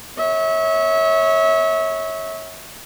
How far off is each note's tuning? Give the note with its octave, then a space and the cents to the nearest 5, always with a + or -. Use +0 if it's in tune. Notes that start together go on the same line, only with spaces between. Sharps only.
C#5 -5 E5 -30